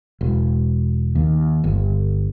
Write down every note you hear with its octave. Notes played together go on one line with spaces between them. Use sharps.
E1
D#2
G1